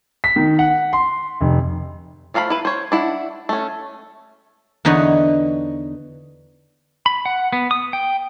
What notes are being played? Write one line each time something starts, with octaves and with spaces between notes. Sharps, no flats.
B6
D#3
F#5
C6
F1
F3 A3 F5 A#5 B5
E4 B4
C5 C#5
D4 E4 F#5
A3 C#4
E2 D3 D#4 B4 C#5
B5
F#5
B3
D#6
G5